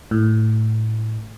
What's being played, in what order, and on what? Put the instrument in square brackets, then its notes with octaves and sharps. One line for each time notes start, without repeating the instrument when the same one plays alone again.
[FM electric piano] A2